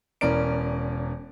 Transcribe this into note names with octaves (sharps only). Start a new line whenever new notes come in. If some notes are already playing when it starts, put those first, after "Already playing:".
E1 E3 C#4 A#4 D5 D7